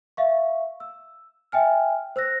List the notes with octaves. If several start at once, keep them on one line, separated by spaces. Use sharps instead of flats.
E5 F5 C#6
E6
E5 G5 G#5 F6
C5 E6 F#6 A#6